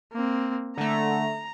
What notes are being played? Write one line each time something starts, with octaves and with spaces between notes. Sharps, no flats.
A#3 C4
D3 A3 A#5